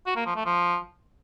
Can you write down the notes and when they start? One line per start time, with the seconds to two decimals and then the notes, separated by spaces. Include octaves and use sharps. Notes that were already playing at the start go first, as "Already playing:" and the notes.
0.06 F#4
0.16 A#3
0.26 F3
0.36 A3
0.45 F3